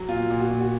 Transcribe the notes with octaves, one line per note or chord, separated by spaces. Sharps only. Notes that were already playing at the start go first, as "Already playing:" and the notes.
Already playing: F#3
A#2 F4
A#2
F#4
A#2
F#4